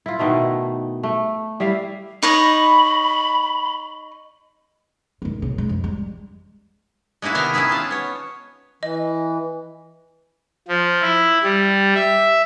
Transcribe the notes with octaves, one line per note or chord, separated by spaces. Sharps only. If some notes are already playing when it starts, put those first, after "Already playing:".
E4 F4
B2 D#3 A3 E4
A3
G3 E4 E5 F5
D#4 C#5 D#5 B5
D#3 G#3
B1 C#3
G#3
F2
G3 G#3
G#3 A#3 D#4 E4 F#4
C3 D#3 B3 A#4 F5
C#4 D#4 E4 G#4 B4
F4 G#5 A5
B3 C#5
E3 D#5
F3
E4
G3
E5